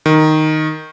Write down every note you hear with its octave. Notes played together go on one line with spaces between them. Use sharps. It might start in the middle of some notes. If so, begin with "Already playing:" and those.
D#3